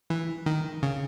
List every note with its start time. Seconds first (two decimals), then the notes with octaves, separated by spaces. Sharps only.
0.10 E3
0.46 D#3
0.83 C#3